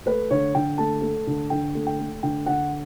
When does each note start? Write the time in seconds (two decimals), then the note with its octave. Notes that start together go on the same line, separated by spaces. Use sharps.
0.06 A3 B4
0.30 D3 C#5
0.55 D3 G5
0.78 A3 A5
1.02 A3
1.27 D3
1.50 D3 G5
1.75 A3
1.87 G5
1.99 A3
2.23 D3 G5
2.46 D3 F#5